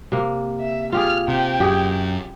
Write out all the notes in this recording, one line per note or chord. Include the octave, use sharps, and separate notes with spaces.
C3 A#3
E5
F4 G4 G#4 F6
C3 G5
F#2 G4 G#4